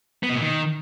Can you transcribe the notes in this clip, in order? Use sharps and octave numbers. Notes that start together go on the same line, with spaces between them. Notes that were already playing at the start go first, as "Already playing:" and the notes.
B3
B2
A#2
D#3